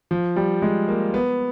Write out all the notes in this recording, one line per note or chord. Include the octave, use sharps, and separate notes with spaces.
F3
G3
G#3
A#3
B3